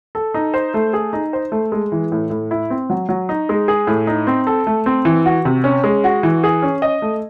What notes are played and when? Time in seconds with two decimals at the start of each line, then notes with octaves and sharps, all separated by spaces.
0.15 A4
0.34 D#4
0.54 C5
0.74 A3
0.93 G#4
1.13 D#4
1.33 C5
1.52 A3
1.72 G#3
1.92 E3
2.12 A2
2.30 A2
2.51 E4
2.70 C4
2.90 F#3
3.09 F#3
3.29 D#4
3.49 G#3
3.68 G#4
3.87 A2
4.07 D#4
4.27 C4
4.47 A4
4.67 A3
4.86 C4
5.05 E3
5.25 F#4
5.45 C3
5.64 C#4
5.84 G#3
6.04 F#4
6.23 E3
6.44 G#4
6.62 C#4
6.82 D#5
7.02 A3